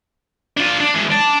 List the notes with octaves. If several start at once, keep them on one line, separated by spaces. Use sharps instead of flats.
D4 F4
D4
E3 G#3
D5 A5